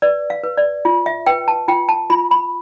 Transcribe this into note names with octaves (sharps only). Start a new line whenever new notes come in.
B4 D5
F5
B4
D5
F4
E5
B4 G5
A5
F4 G5
A5
F4 B5
B5